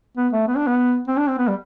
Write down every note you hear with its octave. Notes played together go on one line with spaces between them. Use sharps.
B3
A3
B3
D4
B3
C4
D4
C4
B3
G3